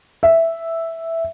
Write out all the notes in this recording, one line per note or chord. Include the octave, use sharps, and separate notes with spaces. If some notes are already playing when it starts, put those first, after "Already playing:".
E5